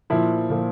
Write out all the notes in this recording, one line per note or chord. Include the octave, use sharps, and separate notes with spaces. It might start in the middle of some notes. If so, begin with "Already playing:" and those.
A#2 F3 E4
A#2 F3